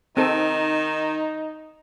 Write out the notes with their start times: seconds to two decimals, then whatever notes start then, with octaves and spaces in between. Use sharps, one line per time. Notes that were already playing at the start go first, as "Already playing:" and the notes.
0.17 D#3 C4 D#4 A4